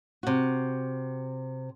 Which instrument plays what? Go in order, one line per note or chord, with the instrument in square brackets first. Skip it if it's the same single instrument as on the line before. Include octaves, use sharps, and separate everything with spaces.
[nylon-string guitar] C3 F#4